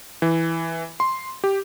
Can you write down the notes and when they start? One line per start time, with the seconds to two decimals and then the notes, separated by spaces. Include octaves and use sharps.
0.22 E3
1.00 C6
1.44 G4